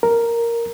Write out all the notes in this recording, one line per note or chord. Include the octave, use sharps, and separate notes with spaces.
A#4